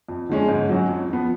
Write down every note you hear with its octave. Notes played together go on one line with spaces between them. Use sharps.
F2
D3 F3 G#3 C#4
G#2
F#3 C#4 F#4
F2
F3 B3